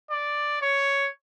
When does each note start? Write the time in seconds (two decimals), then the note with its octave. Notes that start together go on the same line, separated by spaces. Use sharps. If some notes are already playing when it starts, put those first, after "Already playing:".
0.11 D5
0.62 C#5